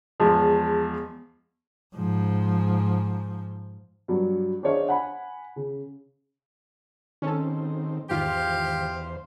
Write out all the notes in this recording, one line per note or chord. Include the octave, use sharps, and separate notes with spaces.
E2 F3 G#3
G#2 F3
G2 F#3
D4 G#4 C5 C#5 D#5 F5
F#5 G#5 B5
C#3
D#3 C4 C#4 A4
E2 G#2 D#3 F4 G4 C5 F5